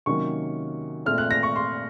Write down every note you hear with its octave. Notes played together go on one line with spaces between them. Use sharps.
C3 D#3 F#3 A#3 C#4 C#6
A#2 A3 C4 F6
F#6
A#6
C#6
C6